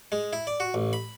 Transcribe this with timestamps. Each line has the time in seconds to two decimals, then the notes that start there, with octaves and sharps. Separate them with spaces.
0.12 G#3
0.33 E4
0.47 D5
0.60 F#4
0.74 A1
0.93 B5